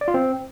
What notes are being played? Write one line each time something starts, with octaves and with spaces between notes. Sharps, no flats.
D5
F4
C4